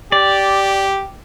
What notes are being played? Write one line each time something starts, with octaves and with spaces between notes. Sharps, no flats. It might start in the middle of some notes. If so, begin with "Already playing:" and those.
G4 D5